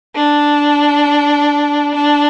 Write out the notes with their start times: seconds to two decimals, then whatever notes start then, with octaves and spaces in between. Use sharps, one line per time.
0.15 D4
1.95 D4